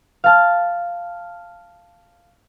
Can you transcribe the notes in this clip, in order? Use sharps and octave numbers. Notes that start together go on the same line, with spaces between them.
F5 A5 F6